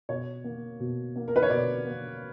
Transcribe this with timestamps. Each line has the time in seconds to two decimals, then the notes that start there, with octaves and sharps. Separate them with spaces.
0.09 B2 C#5
0.44 A#3
0.80 B2
1.16 A#3
1.28 A#4
1.36 B4
1.43 C#5
1.50 B2 D5
1.85 A#3